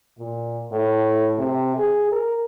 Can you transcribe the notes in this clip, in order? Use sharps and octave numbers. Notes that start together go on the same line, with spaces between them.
A#2
A2
C3
G#4
A#4